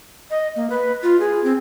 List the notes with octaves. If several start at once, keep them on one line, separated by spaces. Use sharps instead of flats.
D#5
A#3
B4
F4
G#4
C4